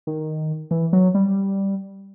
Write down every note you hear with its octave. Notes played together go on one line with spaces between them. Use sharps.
D#3
E3
F#3
G3